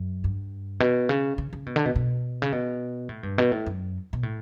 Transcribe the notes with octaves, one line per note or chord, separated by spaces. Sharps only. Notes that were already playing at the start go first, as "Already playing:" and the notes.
Already playing: F#2
G2
B2
C#3
C#3
C#3
B2
D3
B2
B2
C#3
B2
A2
G2
B2
A2
F#2
B2
A2